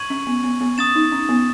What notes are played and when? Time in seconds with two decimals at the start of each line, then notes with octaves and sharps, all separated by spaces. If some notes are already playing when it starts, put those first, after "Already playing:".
Already playing: C#6 G#6 D#7 F#7
0.10 C#4
0.27 B3
0.44 B3
0.61 B3
0.78 C#4 D#6 A6 E7
0.95 D#4
1.12 C#4
1.29 B3